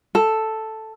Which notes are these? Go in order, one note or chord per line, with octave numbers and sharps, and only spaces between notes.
A4